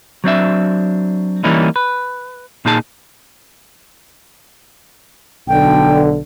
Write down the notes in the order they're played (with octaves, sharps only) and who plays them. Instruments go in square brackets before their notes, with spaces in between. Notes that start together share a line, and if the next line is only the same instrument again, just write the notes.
[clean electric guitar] F#3 C4 D4 E5
E3 G3 A#3 C#4 D#4 E4
B4
A#2 A#3 D#4 G#4 A5
[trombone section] B1 D3 [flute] G5